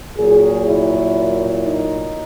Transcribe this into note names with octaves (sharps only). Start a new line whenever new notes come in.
A#2 F#3 G#4
E4
D#4